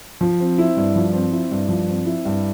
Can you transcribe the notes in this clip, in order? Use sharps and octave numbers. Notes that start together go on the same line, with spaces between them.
F3
C4
E4
G2
F3
C4
E4
G2
F3
C4
E4
G2